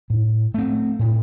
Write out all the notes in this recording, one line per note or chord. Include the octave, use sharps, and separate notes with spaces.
A2
A3 C4
A2